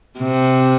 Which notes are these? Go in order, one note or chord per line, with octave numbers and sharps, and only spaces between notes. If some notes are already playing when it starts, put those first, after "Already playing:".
C3